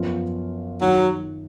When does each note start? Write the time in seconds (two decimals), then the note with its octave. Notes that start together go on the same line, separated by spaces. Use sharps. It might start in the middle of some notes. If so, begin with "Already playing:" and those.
Already playing: F#2 F3 B3 F4
0.81 D#3 F#3